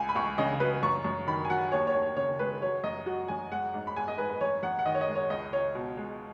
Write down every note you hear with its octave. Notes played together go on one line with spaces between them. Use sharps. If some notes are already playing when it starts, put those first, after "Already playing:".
Already playing: C#2 G#5
B5
C#2 C#6
C#3 D#5
F#3 B4
F#2 C#6
F#2
D#3 B5
G#5
F#3 F#5
D#2 C#5
C#5
D#2
C#5
C#3 C#5
G#3 B4
F#3 C#5
F#2 D#5
F#3 F#4
F#2 G#5
G#3 F#5
G#2
B5
G#3 G#5
D#5
G#2 B4
B4
F#2 C#5
F#2 F#5
F#5
D#3 D#5
C#5
D#5
G#3
C#5
C#2 D#5
C#2 C#5
B2
G#3